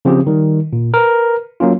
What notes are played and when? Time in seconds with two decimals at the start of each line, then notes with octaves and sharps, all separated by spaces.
0.05 C#3 F3 C4 C#4 G4 G#4
0.27 D#3 G3
0.73 A#2
0.94 A#4 B4
1.60 F#3 A#3 C#4 F4